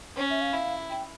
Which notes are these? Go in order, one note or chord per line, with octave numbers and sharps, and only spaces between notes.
C#4 C#5
E5
F5
E4
G5